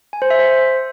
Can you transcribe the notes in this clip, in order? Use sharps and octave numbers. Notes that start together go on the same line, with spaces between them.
G#5
C5
E5
C5